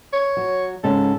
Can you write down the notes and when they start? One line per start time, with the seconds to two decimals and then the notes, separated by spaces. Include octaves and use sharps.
0.13 C#5
0.37 F#3
0.84 G#2 C#3 A4